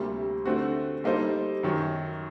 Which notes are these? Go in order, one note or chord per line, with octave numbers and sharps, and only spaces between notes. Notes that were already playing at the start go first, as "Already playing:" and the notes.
Already playing: D2 C3 G3 A#3
D3 A3 C4 F#4
G3 A#3 D#4 A4 C5
F#2 D#3 F#3